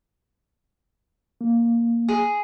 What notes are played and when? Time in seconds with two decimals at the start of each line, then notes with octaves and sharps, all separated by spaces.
1.41 A#3
2.08 G#4